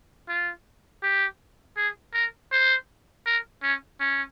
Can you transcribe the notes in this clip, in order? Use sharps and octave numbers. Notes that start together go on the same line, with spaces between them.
F4
G4
G#4
A#4
C5
A#4
C#4
C#4